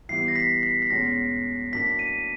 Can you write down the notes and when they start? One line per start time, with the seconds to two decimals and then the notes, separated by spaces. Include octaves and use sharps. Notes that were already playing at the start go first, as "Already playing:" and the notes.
0.09 E3 G3 B3 E4 C7
0.28 A#6
0.36 B6
0.63 B6
0.82 B6
0.90 E2 B2 G#3 C#4 A#6
1.72 A2 F#3 A#3 D4 B6
1.99 D#7